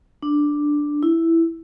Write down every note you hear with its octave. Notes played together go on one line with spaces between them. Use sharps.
D4
E4